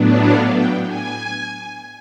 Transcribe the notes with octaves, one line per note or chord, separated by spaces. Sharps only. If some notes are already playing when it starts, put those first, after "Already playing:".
Already playing: A2 F#3 B3 D4
F5
G5
G#5